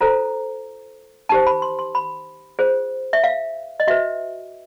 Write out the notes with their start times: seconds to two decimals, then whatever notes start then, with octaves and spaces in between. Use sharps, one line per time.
0.01 F4 A4 C5 A#5
1.29 D#4 G4 C5 A5
1.47 B5
1.62 C6
1.79 C6
1.95 B5
2.59 F4 G#4 C5
3.13 E5
3.24 F5
3.80 D#5
3.87 F#4 B4 E5